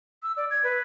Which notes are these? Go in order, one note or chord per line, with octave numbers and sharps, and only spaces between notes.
E6
D5
G#6
B4